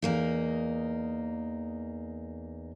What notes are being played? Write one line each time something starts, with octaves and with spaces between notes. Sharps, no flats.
E2 A#3 D#4